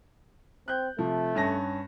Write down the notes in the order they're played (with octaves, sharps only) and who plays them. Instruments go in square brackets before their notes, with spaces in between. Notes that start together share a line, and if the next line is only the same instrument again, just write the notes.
[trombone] C4 [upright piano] F#6 G6
[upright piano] C3 F3 [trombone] A3
[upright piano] G2 C#4 A#6